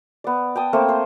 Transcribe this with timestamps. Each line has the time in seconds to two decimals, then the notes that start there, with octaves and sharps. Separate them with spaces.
0.24 B3 D5
0.56 G5 A5 D#6
0.73 A3 A#3 C4
0.89 C5